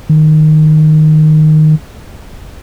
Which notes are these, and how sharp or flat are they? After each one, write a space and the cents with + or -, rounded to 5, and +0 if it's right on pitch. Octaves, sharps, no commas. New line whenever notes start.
D#3 -10